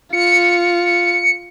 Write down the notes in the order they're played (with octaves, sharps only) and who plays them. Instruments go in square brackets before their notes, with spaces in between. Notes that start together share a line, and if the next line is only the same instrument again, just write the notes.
[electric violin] F4 [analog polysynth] C#7